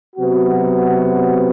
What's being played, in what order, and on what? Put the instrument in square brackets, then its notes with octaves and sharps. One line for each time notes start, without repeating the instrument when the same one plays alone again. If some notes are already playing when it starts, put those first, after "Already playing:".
[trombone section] C3 F#3 B3 F#4